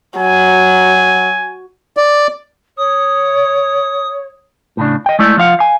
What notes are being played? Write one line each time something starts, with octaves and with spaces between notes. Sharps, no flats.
F#3 G#5
D5
C#5 D#6
A2 C#3 D4
D#5 G5
G#3 A3 E4 D5
F3 F4 F5 F#5
F5 G#5